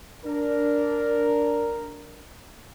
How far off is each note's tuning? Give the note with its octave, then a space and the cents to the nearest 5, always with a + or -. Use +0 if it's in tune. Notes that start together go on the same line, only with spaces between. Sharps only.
D4 -10 A#4 +0